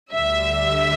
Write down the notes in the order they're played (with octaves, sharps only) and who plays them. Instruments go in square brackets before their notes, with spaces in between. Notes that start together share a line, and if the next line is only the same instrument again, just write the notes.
[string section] D2 D3 G3 E5